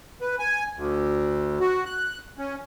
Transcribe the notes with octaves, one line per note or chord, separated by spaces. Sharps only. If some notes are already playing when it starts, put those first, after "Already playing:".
B4
G#5
D2
F#4
F#6
C#4